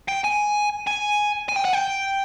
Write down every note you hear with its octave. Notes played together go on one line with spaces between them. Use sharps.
G5
G#5
G#5
G#5
G5
F#5
G5